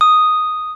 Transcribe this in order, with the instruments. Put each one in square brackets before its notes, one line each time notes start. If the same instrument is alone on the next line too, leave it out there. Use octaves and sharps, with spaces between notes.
[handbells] D#6